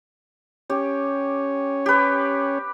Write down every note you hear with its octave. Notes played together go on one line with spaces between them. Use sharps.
C#4 G4 C#5
G4 B4